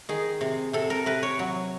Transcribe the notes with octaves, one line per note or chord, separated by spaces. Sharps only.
D#3 G#4
C3
C3 A4
A#4
C3 B4
C#5
F#3